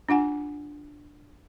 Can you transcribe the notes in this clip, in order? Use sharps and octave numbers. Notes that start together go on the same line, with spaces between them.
D4 F4 F#5 G#5